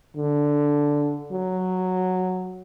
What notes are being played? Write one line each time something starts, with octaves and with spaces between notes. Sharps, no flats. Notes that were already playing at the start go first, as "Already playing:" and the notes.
D3
F#3